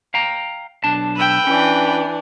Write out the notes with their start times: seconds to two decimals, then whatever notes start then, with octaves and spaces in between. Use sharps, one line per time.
0.14 F5 G5 A#5
0.84 B1 D4 A5
1.16 B4 G5 B5 E6
1.47 E3 C#4 D4